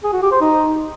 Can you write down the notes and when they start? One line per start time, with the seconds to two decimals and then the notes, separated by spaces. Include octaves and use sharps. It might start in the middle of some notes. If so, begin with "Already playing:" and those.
0.04 G#4
0.13 F#4
0.22 G4
0.32 C5
0.41 D#4